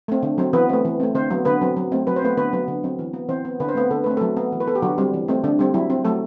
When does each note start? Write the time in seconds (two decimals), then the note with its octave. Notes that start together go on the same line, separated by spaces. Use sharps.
0.08 A3 C4
0.23 D3
0.38 F#3 C4
0.53 E3 B3 B4
0.69 A3 C4
0.85 E3
1.00 A3 C4
1.14 D3 C4 C5
1.30 F#3 B3
1.45 D3 B3 B4
1.61 F#3 C4
1.77 F#3
1.92 A3 C4
2.07 F#3 B4
2.16 C5
2.22 A3 B3 C4 B4
2.37 D3 B3 B4
2.53 F#3 B3
2.68 D3
2.84 F#3 C4
2.99 E3
3.13 B3
3.29 E3 C4 C5
3.45 B3
3.60 D3 B4
3.69 C5
3.75 A3 B3 C4 B4
3.91 D3 A4
4.04 A3 B4
4.10 C4
4.17 F#3 A3 A4
4.37 B3
4.52 E3
4.60 B4
4.67 B3 A4
4.75 G4
4.82 D3 F#3 F#4
4.98 G3 C4
5.14 E3
5.28 A3 C4
5.44 D3 D4
5.59 G3 C4
5.74 F#3 E4
5.90 C4
6.05 F#3 A3 A4